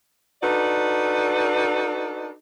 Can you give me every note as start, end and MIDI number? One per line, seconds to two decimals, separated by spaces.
0.42 2.31 62
0.42 2.31 63
0.42 2.31 66
0.42 2.31 69
0.42 2.31 71
0.42 2.31 74